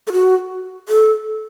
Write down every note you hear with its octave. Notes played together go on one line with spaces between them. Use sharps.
A4
F#4
A4